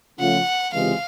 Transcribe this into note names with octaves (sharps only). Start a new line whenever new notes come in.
C#3 F3 A3 C#4 F4 F#5
C#2 C3 E3 G#3 F5